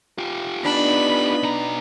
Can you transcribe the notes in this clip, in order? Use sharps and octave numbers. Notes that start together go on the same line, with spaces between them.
F4 G4
B3 D4 D#4 B5
B2 A#5